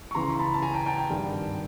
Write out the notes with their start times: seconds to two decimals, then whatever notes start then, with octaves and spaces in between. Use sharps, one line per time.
0.11 C#6
0.15 C#2 C#3 E3 A#5 C6
0.39 A5 B5
0.54 A5
0.62 G#5 A#5
0.74 G5 A5
0.86 G5 A5
0.98 G5 A5
1.10 G#1 G2 D#3